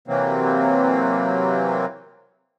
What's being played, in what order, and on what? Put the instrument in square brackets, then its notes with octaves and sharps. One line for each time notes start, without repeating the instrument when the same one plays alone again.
[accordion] C3 E3 F#3 A#3 C4